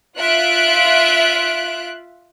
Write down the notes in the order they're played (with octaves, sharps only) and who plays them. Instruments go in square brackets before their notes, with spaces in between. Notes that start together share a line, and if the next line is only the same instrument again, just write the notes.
[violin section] F4 E5 F#6 D7